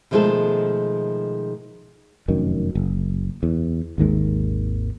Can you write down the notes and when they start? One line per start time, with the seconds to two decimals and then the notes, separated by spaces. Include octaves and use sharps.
0.11 B2 D#3 F3 G#3 A3 A4
2.28 F1 F#2 D#3
2.75 F#1
3.43 E2
3.98 G#1 D#2 D#3 G#3